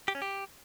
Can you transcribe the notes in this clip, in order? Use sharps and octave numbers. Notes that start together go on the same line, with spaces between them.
G4
C#4
G4